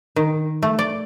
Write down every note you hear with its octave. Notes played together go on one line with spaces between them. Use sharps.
D#3
A3
D5